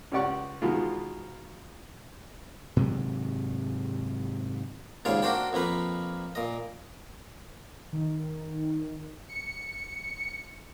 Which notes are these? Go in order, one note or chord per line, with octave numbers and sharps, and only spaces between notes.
C#2 C#4 G4 D5 F#5 C#6
B2 D#3 E3 G#3 F4
G#2 C3 D#3 F#3
D#2 G#2 C#3 F4 C#5 D5
A#3 D4 F#4 C5 D5 G5
F2 F3 A#3 B4
A#2 D#5
D#3
C#7